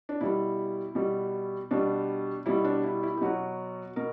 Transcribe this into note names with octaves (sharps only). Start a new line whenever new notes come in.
D4
B2 G3 E4
B2 G3
B2 G3 D4
B2 G3 E4
D4
E4
E4
G4
B2 F#3 F#4
B2 A#4